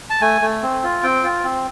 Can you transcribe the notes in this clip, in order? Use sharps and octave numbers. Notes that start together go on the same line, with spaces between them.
A5
A3 G#5
A3
C4
F4
C4 G5
F4
C4